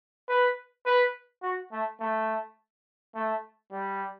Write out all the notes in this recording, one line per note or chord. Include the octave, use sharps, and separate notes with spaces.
B4
B4
F#4
A3
A3
A3
G3